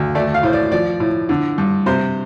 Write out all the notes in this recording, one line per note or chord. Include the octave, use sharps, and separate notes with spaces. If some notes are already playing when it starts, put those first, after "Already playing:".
Already playing: D2
A3 D5
F5
A2 C5
D5
F3 D5
A2
D3
G2
C3 C5